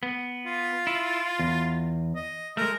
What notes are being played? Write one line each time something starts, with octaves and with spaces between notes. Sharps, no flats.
B3
F4
E4
E2
D#5
G#3 A3 A#4